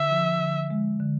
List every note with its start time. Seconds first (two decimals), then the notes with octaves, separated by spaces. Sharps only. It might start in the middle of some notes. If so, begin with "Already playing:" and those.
Already playing: D3 E5
0.10 F3
0.40 D3
0.70 G#3
1.00 D3